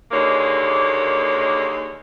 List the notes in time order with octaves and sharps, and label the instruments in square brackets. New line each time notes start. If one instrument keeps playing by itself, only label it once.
[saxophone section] D#2 D3 G#3 A#3 C#5